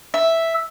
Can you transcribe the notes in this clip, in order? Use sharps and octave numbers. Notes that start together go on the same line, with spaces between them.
E5